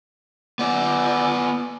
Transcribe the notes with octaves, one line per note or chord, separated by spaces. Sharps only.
B3 D5